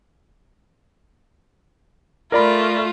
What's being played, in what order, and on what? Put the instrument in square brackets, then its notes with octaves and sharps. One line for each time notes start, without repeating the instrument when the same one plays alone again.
[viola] A3 F4 [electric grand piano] A#4 D5 B5